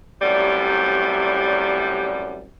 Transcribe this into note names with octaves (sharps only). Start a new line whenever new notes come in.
F#2 A2 C3 G3